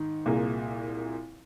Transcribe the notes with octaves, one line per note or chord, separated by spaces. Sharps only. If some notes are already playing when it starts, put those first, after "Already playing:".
Already playing: G#2 D#3 D#4
C2 A#2 A#3 F4 G#4